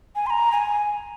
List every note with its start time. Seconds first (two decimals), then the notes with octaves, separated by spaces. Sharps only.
0.16 G#5
0.26 C6
0.30 A#5
0.52 G#5